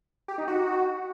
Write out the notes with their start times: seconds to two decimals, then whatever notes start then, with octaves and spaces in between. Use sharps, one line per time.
0.28 G4
0.38 D#4
0.48 F#4